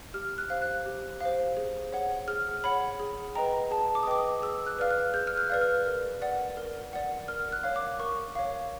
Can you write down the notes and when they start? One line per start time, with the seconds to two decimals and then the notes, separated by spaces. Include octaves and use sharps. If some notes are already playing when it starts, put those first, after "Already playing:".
0.14 G4 F6
0.38 F#6
0.50 C5 F5
0.62 F#6
0.86 G4
1.21 C5 F5
1.57 G#4
1.93 C#5 F#5
2.28 G#4 F6
2.64 C#5 F#5 B5
3.00 G#4
3.35 B4 D#5 G5 A#5
3.71 G#4 A5
3.95 D6
4.03 D#6
4.07 B4 D#5 G5 D6
4.19 D#6
4.42 G#4 E6
4.66 F#6
4.79 B4 D5 F5 F6
4.91 F#6
5.13 G#4 G6
5.27 F6
5.38 F#6
5.50 B4 D5 F5
5.61 F6
5.86 A#4
6.22 D5 F#5
6.57 A#4
6.93 D5 F#5
7.28 A#4 F6
7.52 F#6
7.63 C#5 F5
7.76 D6
8.00 A#4 C#6
8.35 C#5 F5